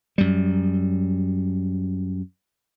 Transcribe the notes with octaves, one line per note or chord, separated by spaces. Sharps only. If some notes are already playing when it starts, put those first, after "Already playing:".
F#2 G3